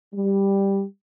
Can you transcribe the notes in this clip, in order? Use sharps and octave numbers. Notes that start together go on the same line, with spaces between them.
G3